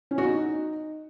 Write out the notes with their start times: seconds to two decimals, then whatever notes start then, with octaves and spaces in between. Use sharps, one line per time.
0.11 C#4
0.18 F#4
0.25 D#4